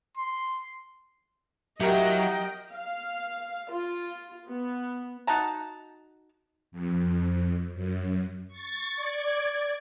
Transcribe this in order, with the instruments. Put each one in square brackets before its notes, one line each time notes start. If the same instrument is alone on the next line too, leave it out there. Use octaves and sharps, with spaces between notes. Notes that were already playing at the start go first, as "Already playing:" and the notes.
[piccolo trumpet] C6
[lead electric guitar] F#3 [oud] E4 F#4 [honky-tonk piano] G4 A#4 [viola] D#5 G5
[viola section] F5
F4
B3
[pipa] D#4 F#4 A5 A#5
[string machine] F2
F#2
C#6 A6
D5 G#6